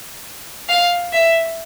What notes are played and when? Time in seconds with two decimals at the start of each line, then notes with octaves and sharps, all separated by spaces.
0.69 F5
1.13 E5